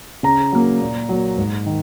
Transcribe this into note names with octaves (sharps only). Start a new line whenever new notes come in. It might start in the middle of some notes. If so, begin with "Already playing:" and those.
C#3 A#5
F#3 A#3
A#2
F#3 A#3
G#2
D#3